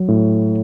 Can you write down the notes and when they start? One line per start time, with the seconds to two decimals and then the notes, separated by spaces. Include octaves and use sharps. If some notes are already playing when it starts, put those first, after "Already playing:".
Already playing: F#3
0.08 A2